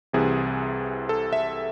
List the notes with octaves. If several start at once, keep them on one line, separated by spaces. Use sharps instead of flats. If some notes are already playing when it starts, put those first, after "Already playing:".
C2 C3 E3 G#4
A4
E5